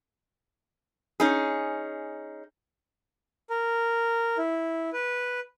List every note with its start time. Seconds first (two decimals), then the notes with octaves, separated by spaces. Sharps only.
1.20 C#4 D#4 G#4
3.50 A#4
4.38 E4
4.93 B4